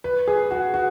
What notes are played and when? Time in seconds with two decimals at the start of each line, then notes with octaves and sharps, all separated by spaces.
0.04 B4
0.28 G#4
0.51 F#4
0.74 F#4